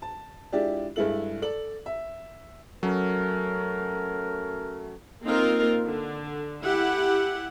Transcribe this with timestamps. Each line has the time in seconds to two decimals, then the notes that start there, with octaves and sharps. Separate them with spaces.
0.02 A5
0.52 G#3 D4 E4 F4 G4 D5
0.96 G2 G#3 E4 A4 F#7
1.42 A4 D5 F#7
1.86 E5
2.83 F#3 A3 C#4 A#4
5.24 A#3 C4 D#4 F4 A#4
5.87 D3
6.62 E4 G4 F#5